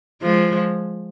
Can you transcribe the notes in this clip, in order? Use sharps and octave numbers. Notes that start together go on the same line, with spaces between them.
F3 G#3